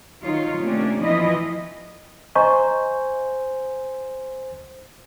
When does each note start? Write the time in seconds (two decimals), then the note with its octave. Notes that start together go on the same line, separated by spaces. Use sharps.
0.23 D#3 F#3 D#4 F4 C#5
0.57 C3 A3 A#3 C#4 D4
1.03 E3 F3 B3 E4 F4 D#5
2.35 C5 D#5 G#5 A#5 C#6